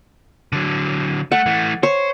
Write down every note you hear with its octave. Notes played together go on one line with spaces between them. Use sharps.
D3 F#3
A3 F#5
E3 A3
C5 C#5